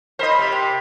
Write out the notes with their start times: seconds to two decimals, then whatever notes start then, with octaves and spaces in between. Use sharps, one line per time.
0.19 A#4 C5 D#5 B5
0.39 C3
0.52 G4